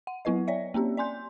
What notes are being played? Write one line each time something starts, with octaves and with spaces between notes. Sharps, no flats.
F#5
F#3 B3 E4 B4 D#5
C#5 D5 E5
A#3 C4 C#4 G4
D5 G#5 C6 G6